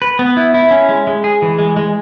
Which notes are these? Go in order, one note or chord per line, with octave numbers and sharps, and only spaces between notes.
B4
B3
E4
E4
C#4
G#3
G#3
G#4
E3
G#3
G#3